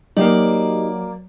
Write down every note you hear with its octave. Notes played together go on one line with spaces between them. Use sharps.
F#3 A#3 D#4 G4 D5 D#5